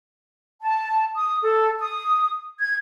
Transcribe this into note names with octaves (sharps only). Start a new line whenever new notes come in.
A5
D#6
A4
D#6
G#6